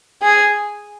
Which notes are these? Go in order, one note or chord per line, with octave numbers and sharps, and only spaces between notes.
G#4